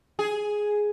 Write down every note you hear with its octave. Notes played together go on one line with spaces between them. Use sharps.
G#4